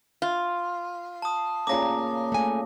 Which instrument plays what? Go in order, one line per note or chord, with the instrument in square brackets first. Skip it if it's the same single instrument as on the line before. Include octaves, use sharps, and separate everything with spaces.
[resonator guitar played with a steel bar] F4
[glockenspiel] A5 D#6
[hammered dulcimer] A#2 C#3 A#5 [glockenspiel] D6 A#6
[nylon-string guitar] A3 G#5